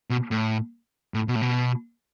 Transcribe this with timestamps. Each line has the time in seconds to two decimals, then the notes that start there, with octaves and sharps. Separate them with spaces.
0.10 B2
0.31 A2
1.14 A2
1.28 B2
1.35 A2
1.42 B2